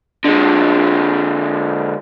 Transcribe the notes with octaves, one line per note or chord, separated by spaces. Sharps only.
D3 G#3